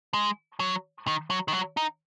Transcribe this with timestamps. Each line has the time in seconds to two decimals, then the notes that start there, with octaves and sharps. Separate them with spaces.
0.14 G#3
0.60 F#3
1.08 D#3
1.30 F#3
1.48 D#3
1.53 F#3
1.77 D#4